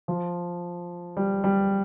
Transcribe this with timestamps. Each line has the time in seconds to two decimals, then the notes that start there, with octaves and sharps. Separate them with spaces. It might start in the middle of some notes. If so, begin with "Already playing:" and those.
0.08 F3
1.17 G3
1.44 G3